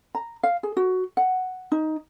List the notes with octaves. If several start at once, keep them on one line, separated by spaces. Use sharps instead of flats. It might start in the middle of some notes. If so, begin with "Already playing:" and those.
A#5
F5
G#4
F#4
F#5
D#4